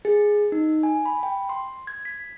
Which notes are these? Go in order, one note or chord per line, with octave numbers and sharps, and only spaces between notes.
G#4
D#4
G#5
B5
G5
C6
G#6
B6